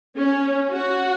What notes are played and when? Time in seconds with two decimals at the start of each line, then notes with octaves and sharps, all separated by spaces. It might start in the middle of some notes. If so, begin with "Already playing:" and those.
0.17 C#4
0.71 F#4